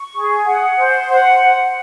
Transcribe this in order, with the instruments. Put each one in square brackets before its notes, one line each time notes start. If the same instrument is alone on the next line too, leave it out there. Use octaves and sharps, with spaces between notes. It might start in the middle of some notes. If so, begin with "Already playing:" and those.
Already playing: [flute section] C#6
G#4
F#5
C5
F#5